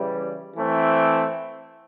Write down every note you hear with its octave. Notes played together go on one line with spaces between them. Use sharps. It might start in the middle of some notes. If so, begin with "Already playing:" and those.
Already playing: C#3 E3 G3
E3 A3 C4